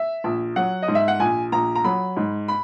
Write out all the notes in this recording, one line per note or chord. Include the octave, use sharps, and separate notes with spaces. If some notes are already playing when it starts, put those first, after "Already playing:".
Already playing: E5
A#1
F#3 F#5
D#5
G#2
E5
F#5
A#1 G#5
A#1 A#5
A#5
F#3 B5
G#2
B5